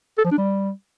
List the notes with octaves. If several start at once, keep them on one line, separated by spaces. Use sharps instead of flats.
A4
F3
D4
G3